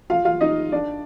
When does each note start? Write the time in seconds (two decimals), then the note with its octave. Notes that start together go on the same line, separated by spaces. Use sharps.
0.10 F4 F5
0.25 F4 F5
0.41 D#4 D#5
0.72 D4 D5